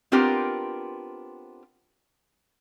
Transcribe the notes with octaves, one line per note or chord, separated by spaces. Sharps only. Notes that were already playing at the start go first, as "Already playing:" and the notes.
B3 C4 D4 F4 G4 A#4